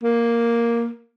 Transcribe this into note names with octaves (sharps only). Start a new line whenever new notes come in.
A#3